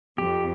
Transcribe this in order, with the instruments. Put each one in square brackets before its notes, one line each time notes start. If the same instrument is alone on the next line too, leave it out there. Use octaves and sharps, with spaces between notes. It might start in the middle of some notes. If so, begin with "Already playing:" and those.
[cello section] F2 [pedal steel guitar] G4